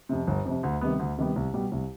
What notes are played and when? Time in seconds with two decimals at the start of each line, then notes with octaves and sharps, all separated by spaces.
0.09 F2 C3
0.27 G1
0.45 F2 C3
0.63 D2
0.81 C3 D#3 G3 B3
0.99 D2
1.18 C3 D#3 G3 B3
1.36 C2
1.54 B2 G3
1.72 C2